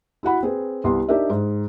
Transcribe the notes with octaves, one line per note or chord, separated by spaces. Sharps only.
E4 F#4 F#5 B5
C4 G#4 B4
C2 B3 C6
D4 D#4 G4 A#4 D5 E5
G#2